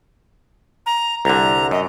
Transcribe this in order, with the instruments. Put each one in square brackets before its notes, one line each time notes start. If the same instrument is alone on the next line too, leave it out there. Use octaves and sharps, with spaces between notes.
[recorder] A#5
[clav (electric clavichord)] C2 D3 [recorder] A#5
[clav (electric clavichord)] F#2 [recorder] D#5